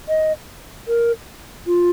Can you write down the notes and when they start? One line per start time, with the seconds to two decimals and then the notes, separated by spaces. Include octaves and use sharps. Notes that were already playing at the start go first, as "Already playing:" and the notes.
0.09 D#5
0.88 A#4
1.67 F4